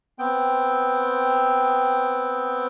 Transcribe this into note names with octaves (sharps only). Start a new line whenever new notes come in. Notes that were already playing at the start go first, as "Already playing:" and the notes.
B3 C4 G5